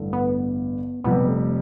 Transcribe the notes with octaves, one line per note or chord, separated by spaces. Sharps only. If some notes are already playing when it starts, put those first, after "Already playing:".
Already playing: A1 G2 D3 A3
B3
F1 F2 C3 G3 B3
A3